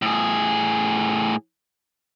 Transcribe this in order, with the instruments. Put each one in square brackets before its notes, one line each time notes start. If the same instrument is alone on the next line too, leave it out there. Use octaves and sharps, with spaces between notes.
[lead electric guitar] A2 G#4